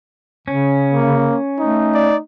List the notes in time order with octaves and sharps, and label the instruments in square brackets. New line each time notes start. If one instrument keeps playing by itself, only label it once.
[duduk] C#3 [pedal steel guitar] C#4
[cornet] A#3
[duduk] A3 [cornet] D#4
[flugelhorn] D5